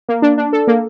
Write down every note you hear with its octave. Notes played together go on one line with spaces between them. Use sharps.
A#3
D4
D4
A4
A#3